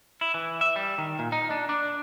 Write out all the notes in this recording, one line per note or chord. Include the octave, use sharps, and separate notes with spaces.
E4
E3
E5
G3
D#3
A#2
D#4
D4
D4